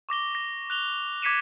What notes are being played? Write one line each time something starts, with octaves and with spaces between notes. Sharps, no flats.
C#6 D6 A#6 G7
A#6
F#6 F7 G7
D6 G#6 B6 C#7 D#7 E7